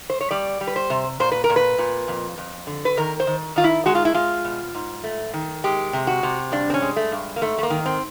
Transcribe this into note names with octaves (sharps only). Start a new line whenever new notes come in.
C5
C#5
G3 D5
G3
B4
C5
C3
A#2 C5
B4
A#4
A#2
B4
A#2
F2
F2
D3
B4
D#3 A#4
C5
D#3
D#3 F4
E4
G#3 F#4
F4
E4
G#3 F4
B2
G#2
A3
D#3
G#3 G4
C3
F#4
C3
G2 D4
C4
C#4
G#3
A3
G2
A#3
G#2 A3
A3
A#3
D#3
C4